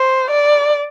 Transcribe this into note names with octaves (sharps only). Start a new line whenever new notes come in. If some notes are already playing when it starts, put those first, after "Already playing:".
Already playing: C5
D5